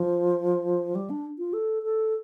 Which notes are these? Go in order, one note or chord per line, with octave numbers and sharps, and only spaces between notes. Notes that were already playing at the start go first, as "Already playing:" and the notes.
Already playing: F3
G3
D4
F4
A4
A4